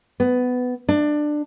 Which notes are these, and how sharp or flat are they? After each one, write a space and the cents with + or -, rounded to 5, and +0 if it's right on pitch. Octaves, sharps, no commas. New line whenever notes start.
B3 +15
D4 +20